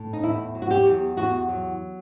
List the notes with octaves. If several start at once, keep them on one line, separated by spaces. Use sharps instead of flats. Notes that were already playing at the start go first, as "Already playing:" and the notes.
Already playing: A2
D#4
E2 E4
F#3
F#4
G4
E2
E2 F#4
F#3